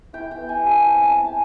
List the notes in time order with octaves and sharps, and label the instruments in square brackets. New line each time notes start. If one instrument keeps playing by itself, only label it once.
[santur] E4 G5
G5
B3
G#5
G3
A5
C4 G#5
A5
G#3
G#5